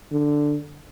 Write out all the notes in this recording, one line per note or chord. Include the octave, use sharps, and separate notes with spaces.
D3